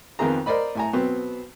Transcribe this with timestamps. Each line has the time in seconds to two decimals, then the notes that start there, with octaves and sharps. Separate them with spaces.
0.19 F2 D#3 B3 C4 G#4 A#5
0.46 A#4 C5 D5 D#5 B5
0.75 A2 G#5 A#5
0.93 B2 F#3 B3 C4